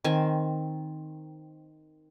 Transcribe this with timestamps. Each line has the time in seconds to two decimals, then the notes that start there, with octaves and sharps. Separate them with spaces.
0.04 D#3 C4 G#5